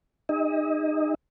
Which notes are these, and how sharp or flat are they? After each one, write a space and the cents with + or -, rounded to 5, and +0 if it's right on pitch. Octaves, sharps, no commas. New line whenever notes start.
D#4 -25 G#4 -45 D#5 +40